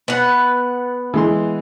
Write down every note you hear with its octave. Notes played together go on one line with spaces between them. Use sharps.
B3 F#5
E3 G#3 C6